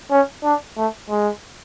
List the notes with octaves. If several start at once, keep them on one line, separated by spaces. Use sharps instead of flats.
C#4
D4
A3
G#3